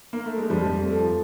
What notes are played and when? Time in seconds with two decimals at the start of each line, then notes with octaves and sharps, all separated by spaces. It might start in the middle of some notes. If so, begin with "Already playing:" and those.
0.13 A#3
0.26 A3
0.38 G#3
0.50 F2 F3 G3
0.66 F2
0.84 A3
0.99 F3